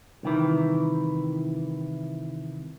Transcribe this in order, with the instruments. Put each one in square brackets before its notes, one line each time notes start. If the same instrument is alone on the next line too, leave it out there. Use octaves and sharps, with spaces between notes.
[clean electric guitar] C2 D#3 E3